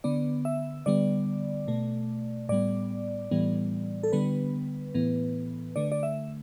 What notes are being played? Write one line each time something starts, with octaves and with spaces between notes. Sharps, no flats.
D3 B3 D5
E5
D3 G3 B3 D5
B2 A3
A2 G3 B3 D5
A2 E3 G3 B3
A4
D3 G3 B3 B4
A2 E3 B3
D3 A3 D5
D5
E5